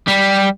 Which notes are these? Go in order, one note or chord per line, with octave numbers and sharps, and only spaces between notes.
G3